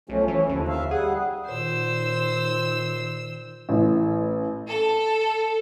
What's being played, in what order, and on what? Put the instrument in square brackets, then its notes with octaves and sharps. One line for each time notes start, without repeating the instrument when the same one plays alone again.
[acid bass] B1 [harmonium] F3 A3 C#4
[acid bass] E3 [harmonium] C#4
[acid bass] D#2 [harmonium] D3 F3
[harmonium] E5 F5
[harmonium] G3 F#5 [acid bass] G#4
[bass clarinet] A#2 [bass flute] D#3 [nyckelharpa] C5 [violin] E6
[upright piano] A1
[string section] A4